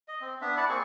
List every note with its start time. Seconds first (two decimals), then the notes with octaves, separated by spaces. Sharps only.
0.08 D#5
0.21 C4
0.41 B3 D4 E5
0.57 E4 D5 F#5 A5
0.69 A#3 C4 G#4 C#6